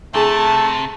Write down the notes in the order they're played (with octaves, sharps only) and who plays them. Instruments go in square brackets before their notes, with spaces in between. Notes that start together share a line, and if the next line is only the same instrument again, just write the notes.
[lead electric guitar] C3 [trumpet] A3 [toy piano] D4 E4 G#4 [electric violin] A5